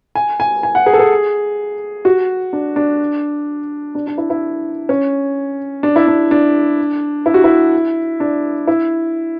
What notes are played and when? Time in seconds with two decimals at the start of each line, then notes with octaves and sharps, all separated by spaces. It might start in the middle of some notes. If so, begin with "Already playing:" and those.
0.15 G#5
0.40 G#5
0.63 G#5
0.75 F#5
0.86 G#4
0.93 A4
0.99 G#4
2.05 F#4
2.53 D4
2.76 D4
3.95 D4
4.07 D4
4.18 E4
4.30 E4
4.89 C#4
5.83 D4
5.96 E4
6.08 D4
6.31 D4
7.26 E4
7.34 F#4
7.44 E4
8.20 D4
8.67 E4